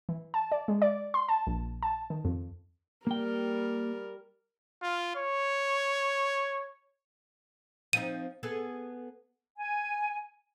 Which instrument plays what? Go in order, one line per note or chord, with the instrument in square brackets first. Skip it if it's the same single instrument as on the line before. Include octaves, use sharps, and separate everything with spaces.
[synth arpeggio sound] E3
A5
D5
G#3
D5
C6
A5
A#1
A5
D#3
F2
[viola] G3 A#4 [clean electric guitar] A#3 G5
[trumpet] F4
C#5
[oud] F3 C4 D#4 [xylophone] D#7
[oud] B3 G#4 A4
[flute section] G#5